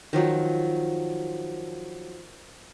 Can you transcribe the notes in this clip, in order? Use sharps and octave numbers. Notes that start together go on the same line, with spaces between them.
D#3 F3 F#3